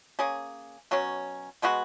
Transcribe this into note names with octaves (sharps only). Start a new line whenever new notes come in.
A#3 C#4 G#4
B2 F#3 C#4
B2 G#3 B3 F#4